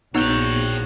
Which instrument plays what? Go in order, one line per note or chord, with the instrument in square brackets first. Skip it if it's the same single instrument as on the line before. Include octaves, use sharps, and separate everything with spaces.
[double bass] A#1 [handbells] B3 D#4 [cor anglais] F#4 [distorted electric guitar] C#5 G5